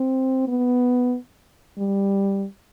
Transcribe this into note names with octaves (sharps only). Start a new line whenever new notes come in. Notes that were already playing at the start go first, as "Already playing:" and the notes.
Already playing: C4
B3
G3